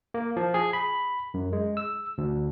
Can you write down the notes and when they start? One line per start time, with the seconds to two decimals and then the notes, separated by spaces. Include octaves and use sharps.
0.14 A#3
0.37 F3
0.54 G#4
0.73 B5
1.34 F#2
1.53 G#3
1.77 E6
2.18 D2